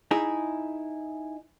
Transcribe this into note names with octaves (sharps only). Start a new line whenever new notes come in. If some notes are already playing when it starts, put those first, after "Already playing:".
D#4 E4 G#4